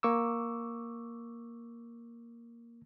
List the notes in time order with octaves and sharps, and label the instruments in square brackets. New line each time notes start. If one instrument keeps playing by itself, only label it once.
[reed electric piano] A#3 C#6 D6 E6